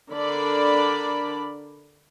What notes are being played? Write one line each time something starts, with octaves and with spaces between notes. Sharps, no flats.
D3 D4 A#4 D5 B5